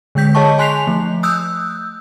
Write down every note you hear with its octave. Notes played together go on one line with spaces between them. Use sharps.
D3 G#3 G5 G6 B6
G#4 C#5 D#5 A5 C#6
G#5 C6 F#6 B6 C7 F7
F3 A3
D#6 E6 F#6 G6